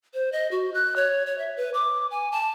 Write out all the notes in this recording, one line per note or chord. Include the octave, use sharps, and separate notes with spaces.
C5
D#5
F#4
F#6
C#5
C#5
E5
B4
D6
G#5
A5